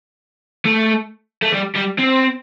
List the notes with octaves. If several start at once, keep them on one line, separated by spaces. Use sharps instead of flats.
A3
A3
G3
G3
C4